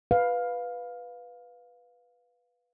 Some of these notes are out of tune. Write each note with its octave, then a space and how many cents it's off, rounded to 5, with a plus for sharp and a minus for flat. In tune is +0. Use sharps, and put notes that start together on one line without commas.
B4 +0 F5 +10